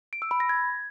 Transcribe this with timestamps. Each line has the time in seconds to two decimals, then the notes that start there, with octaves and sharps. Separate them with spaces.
0.13 D7
0.22 E6
0.31 B5
0.40 A#6
0.49 G#6